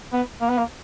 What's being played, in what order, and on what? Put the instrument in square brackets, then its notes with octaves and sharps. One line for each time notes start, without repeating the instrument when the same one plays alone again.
[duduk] B3
A#3
B3
A#3